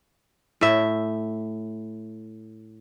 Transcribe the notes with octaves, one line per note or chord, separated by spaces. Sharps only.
A2 E5